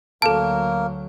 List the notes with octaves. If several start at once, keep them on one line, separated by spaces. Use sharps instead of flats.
D2 F#3 A#3 A4 A#4 A5